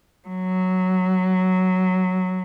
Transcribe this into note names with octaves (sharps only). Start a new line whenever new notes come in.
F#3